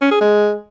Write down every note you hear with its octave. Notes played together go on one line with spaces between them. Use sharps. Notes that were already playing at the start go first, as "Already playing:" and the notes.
C#4
G#4
G#3